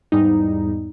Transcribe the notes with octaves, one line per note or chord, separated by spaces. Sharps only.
E2 G#2 G3 D#4